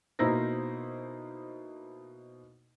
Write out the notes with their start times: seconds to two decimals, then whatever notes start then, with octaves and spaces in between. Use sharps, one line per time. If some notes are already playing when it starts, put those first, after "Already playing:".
0.19 B2 A#3 D#4 E4 C5 A#6